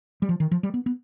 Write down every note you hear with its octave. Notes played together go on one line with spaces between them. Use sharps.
G3
F3
D#3
F3
G3
B3
B3